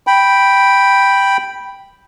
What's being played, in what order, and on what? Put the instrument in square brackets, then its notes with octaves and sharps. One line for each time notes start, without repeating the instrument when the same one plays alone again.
[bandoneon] G5 B5